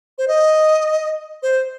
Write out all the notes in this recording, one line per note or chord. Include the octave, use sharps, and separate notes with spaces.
C5
D#5
C5